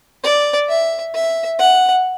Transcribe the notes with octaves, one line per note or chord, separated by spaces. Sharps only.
D5
E5
E5
F#5